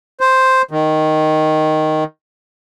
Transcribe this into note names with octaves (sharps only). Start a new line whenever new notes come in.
C5
D#3